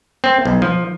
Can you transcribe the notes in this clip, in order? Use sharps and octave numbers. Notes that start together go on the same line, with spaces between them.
C4
B1
F3